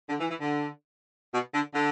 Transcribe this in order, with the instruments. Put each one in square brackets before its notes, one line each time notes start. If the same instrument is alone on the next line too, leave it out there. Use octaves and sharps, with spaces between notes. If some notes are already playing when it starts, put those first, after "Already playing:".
[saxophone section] D3
E3
E3
D3
B2
D3
D3